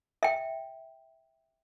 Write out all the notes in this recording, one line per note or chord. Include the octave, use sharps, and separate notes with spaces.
E5 G5